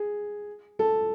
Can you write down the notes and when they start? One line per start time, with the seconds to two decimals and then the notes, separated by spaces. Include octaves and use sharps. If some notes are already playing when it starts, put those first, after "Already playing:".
Already playing: G#4
0.79 A4